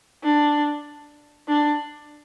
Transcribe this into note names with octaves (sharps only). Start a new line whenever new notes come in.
D4
D4